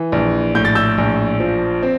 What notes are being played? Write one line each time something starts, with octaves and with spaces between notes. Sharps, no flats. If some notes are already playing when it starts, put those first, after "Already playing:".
Already playing: E3
A#1
A2 G6
A6
E6 G6
A#1
F3
C4